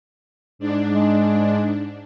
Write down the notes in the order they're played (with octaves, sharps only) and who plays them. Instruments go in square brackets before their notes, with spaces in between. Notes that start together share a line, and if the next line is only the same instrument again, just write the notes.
[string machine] G#2 D4
[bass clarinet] G#3